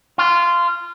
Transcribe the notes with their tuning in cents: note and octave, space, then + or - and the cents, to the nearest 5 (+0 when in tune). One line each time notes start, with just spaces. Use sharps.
F4 -15